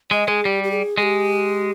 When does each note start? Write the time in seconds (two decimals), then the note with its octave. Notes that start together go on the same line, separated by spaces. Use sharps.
0.11 G#3 D#5
0.28 G#3 G#4
0.45 G3 G4
0.64 G4
0.71 G#4
0.98 G#3 G#4
1.03 G4